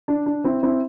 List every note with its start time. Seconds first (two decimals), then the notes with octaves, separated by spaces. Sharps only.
0.08 D4
0.26 D4
0.44 C4 E4
0.63 C4 E4